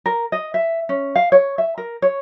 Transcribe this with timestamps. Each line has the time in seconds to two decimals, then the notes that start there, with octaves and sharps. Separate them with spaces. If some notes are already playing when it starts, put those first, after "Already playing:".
0.06 A#4
0.32 D#5
0.54 E5
0.89 C#4
1.16 F5
1.32 C#5
1.58 E5
1.78 A#4
2.02 C#5